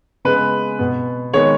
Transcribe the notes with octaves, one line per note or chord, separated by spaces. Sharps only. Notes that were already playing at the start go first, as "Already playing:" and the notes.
C#3 G#3 B3 B4
B2 B3
D#3 G#3 B3 C#5